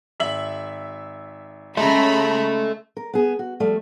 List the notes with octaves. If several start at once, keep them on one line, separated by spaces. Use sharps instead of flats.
G#1 E5 F#7
C#3 G#3 A4 E5 A#5 B5
A#4
B3 G#4
F#4
F3 G3 A3